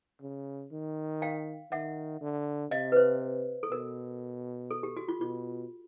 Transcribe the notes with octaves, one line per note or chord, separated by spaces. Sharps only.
C#3
D#3
F5 G5
D#3 E5 F#5
D3
C3 D#5 F5
B4
C5
A4
B2 A#4
A4
G4
F#4
F4
B2 F4